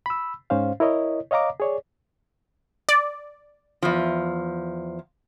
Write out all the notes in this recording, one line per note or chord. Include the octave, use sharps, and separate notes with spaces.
B5 E6
G#2 C#4 C5 F5
E4 A#4 C#5 D#5
C#5 D#5 F5 A#5 D6
G#4 C#5 D5
D5
E2 F3